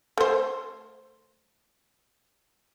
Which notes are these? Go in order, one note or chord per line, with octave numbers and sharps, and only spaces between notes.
A3 C5